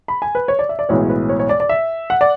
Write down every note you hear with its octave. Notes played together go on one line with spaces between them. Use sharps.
B5
G#5
B4
C#5
D5
E5
D5
B1 A2 E3 G#3 B3 C#5
B4
C#5
C#5
D5
D5
E5
F#5
D5